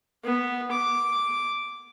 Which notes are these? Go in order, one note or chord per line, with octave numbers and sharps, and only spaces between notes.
B3
D6